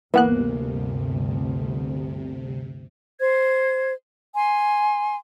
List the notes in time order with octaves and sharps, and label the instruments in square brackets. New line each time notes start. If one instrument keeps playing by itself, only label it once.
[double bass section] G1 D2 [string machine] C3 [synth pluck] E3 B3 F#6 [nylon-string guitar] A#3
[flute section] C5 G#6
G#5 C6